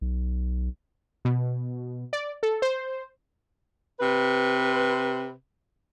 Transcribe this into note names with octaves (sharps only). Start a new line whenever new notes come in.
B1
B2
D5
A4
C5
C3 B4